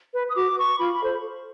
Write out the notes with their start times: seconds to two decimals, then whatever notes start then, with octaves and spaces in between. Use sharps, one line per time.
0.13 B4
0.28 D#6
0.35 F#4 D6
0.56 B4 C#6
0.78 F4 B5
0.92 B5
1.00 A4 C5